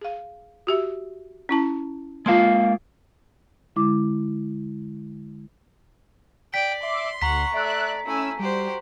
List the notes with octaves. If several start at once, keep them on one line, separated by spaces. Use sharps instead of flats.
G#4 F5
F#4 G4 E5
C#4 E4 A5
G#3 A#3 F4 F5 A5 C6
D3 G#3 E4 D6
D5 G5 B6
E5 C6 D6
D2 F#5 A#5 C#6 B6
A3 D5 E5 F#6
A3 C#4 E4 G#5 E6
G3 F#4 G4 C5